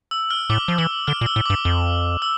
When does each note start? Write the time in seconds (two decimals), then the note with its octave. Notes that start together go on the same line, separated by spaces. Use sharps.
0.11 E6
0.30 F6
0.50 A2 D6
0.68 F3
0.78 E3 E6
1.07 D3 F6
1.21 A#2
1.26 E6
1.36 A2
1.46 G2 D6
1.65 F2
2.22 E6